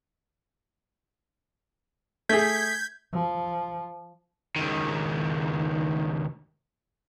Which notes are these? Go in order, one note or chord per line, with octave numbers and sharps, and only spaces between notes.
A3 G#4 G6 G#6 B6
F3
C#2 D#3